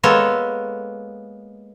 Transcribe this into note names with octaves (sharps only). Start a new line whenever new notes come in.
G#3 A#3 B3 A4 C#5